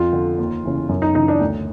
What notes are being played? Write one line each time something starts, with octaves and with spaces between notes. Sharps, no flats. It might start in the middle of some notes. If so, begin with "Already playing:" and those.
Already playing: F2 F4
D3
D#2
C#3 E3
F#2
D#4
C#3 E3 D#4
D4
D2